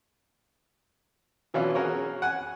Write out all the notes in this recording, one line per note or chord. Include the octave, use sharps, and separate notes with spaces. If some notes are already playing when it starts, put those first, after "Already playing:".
B2 E3 F#3 C#4 D4 F4
C#4 F#4 G#4 A#4 C#5
F#5 G#5